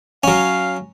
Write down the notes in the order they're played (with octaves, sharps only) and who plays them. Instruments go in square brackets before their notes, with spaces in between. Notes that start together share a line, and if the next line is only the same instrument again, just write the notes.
[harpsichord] F#3 C#4 [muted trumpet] F5